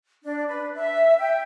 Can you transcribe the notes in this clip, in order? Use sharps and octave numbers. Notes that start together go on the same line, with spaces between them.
D4
B4
E5
G5